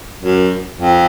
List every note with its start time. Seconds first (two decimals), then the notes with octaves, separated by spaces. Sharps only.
0.23 F#2
0.78 F2